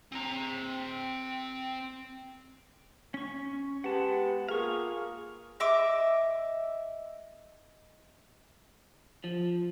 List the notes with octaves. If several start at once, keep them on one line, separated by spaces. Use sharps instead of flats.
C4 A#5
C#4 C#6
G#3 B3 G4 F#5 A5
A#3 F4 G#4 F5 C#6
D#5 E5 D6
F3